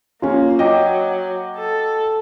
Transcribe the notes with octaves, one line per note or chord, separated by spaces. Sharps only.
A#3 C#4 F4
F#3 D#5 G5 D6
A4